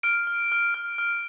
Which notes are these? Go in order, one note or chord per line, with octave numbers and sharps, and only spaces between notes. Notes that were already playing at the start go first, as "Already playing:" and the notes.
F6 D7
F6
F6
F6
F6